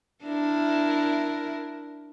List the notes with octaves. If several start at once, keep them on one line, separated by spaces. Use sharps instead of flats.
D4 E4 A#4